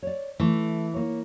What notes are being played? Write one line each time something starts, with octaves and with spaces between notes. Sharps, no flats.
C#5 D5
E3 A3
A#3 C#5